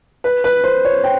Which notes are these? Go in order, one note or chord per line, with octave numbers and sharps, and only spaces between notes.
B4
B4
C5
C#5
G5